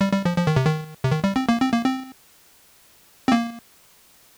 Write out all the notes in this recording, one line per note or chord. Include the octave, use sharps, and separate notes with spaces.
G3
G3
F3
F3
D#3
C3
D#3
C3
D#3
G3
C4
A#3
C4
A#3
C4
C4
A#3